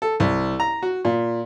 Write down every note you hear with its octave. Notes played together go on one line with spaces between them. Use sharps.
A4
C2
A#5
F#4
A#2